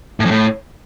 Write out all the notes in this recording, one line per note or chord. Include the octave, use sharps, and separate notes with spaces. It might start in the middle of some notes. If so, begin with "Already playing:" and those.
A2
F2
A2